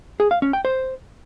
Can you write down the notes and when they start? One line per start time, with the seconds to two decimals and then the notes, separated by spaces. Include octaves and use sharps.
0.20 G#4
0.31 F5
0.42 C#4
0.53 G5
0.65 C5